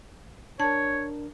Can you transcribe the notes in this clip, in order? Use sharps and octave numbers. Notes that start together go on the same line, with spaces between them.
D4 A#4 C#5 A5